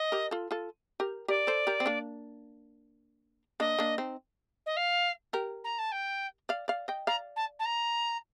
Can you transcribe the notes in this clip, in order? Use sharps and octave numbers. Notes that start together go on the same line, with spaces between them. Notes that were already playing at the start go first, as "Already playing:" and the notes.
Already playing: D#5
G4 A#4
F4 A4
F4 A4
G4 A#4
G4 A#4 D5
A4 C5
G4 A#4
C4
A#3 D4
A#3 D4 D#5
A#3 D4
C4 D#4
D#5
F5
G4 A#4
A#5
A5
G5
D5 F5
D5 F5
D#5 G5
D5 F5 A#5
A5
A5
A#5